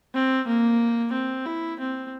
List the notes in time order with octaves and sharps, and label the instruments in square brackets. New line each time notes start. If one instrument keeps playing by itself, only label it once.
[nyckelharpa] C4
A#3
C4
E4
C4